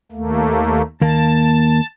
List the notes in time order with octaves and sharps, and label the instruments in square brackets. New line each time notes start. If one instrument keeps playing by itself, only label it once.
[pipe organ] D#2 A3 A#3
[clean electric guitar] D#2 A#3 [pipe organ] A5